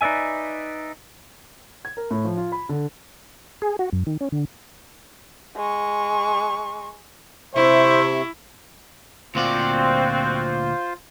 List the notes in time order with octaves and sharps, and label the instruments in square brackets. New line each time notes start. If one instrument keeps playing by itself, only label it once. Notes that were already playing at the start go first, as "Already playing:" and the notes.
[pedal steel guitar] D#4 B4 D5 E5 G#5
[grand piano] G#6
A#4
A2
F3
F4
B5
D3
[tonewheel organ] G#4
F#4
F#2
D#3
C#4
D3
[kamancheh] G#3 C#6
[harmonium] C3 E5 [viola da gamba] E4 [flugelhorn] C5 [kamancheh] C#6
[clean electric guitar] D2 A#2 D5 [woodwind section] C4 F#4 [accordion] F4 C5